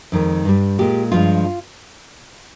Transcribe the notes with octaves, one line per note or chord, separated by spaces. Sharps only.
F2 D#3 G#3
G2 G3
A#2 G#3 G4
G2 F3 G#3 F4